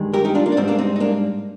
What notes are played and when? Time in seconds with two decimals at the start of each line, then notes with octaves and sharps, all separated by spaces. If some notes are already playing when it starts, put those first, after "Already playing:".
Already playing: G2 D#3 G#3
0.14 G4 A#4
0.25 D#4 G4
0.35 D4 F4
0.46 A#3
0.52 D4
0.57 G#2 G3 C4
0.68 A#3 D4
0.78 C4 D#4
0.96 D#4
1.00 A#3 D4